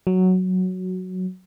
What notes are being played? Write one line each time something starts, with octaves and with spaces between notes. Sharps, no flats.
F#3